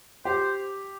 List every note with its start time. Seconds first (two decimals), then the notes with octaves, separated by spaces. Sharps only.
0.25 G4 C5